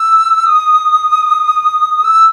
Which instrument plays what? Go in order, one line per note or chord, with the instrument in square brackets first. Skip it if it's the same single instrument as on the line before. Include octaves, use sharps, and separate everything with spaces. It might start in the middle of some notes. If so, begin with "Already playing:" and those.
Already playing: [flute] E6
D#6
E6